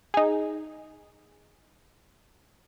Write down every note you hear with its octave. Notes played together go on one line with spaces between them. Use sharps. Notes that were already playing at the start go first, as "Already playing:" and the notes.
D#4 G#4